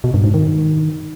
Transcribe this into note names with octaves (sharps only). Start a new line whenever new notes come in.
B2
G2
G#2
D#3